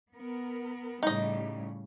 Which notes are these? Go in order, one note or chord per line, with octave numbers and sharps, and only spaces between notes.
B3 A#4
A2 C#3 G3 D#4 D#5